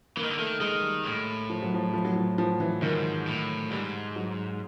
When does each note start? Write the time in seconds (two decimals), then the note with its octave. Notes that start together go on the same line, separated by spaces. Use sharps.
0.17 E3 A#3
0.23 D#3
0.31 D3
0.38 D#3 A3
0.60 D#3 G#3
0.82 G3
1.05 A2
1.50 F3
1.62 F#3
1.74 F3
1.93 F3
2.05 F#3
2.16 F3
2.38 F3
2.60 E3
2.82 G#2 D#3
3.27 A2
3.71 G#2 G3
4.16 F#3